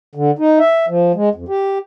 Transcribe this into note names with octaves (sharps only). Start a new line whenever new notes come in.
D3
D#4
E5
F3
G#3
F2
G4